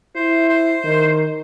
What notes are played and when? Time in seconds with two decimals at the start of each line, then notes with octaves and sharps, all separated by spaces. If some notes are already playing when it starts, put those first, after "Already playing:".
0.16 E4 C5
0.49 C5
0.84 D#3